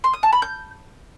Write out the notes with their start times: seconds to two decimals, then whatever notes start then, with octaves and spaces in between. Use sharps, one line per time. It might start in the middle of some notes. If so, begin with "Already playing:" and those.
0.04 C6
0.13 D#6
0.23 A5
0.33 B5
0.42 G6